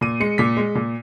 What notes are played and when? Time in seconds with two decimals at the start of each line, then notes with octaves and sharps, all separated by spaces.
0.01 A#2 D#7
0.20 G#3 C#7
0.38 A#2 B6
0.57 G#3
0.75 A#2